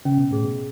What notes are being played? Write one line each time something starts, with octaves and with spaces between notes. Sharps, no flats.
C#3 C#4
B2
A2 G#4
B2